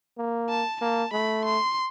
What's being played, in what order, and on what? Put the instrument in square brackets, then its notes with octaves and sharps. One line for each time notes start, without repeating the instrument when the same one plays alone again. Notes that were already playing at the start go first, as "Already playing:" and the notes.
[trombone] A#3
[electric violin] A5
[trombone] A#3 [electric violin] A5
[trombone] A3 [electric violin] B5
[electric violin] C6